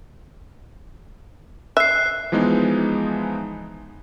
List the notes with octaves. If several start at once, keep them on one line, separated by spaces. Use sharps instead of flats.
E5 F#6 C7
E3 F3 G#3 B3 D#4